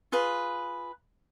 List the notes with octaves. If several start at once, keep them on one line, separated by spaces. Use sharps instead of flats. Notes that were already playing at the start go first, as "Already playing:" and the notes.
F4 G#4 B4